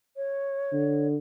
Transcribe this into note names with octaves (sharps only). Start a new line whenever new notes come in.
C#5
D3